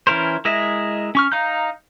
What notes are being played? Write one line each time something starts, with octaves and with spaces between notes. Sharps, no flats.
E3 C#4 E4 A#4 C5
G#3 E4 A#4 D#5 E5
C#4 C#6 F6
D#4 F5 A#5 G6